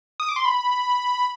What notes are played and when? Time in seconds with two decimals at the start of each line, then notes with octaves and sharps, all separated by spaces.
0.20 D#6
0.29 D6
0.36 C6
0.45 B5